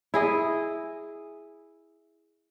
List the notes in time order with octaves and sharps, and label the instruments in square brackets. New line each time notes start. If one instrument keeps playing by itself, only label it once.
[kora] E4 G#4 D#5